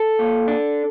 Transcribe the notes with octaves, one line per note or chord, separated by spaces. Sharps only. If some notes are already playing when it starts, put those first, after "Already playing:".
Already playing: A4
A#2
D4